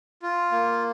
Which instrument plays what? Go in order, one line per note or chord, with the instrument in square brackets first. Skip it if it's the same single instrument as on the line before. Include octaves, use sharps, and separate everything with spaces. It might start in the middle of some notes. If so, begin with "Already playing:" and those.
[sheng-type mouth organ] F4
A#3